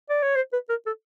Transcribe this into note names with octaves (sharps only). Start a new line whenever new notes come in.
D5
C#5
C5
B4
A#4
A4